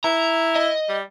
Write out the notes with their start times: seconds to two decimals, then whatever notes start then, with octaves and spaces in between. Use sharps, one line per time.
0.04 E4 A#5
0.55 D#5
0.89 G3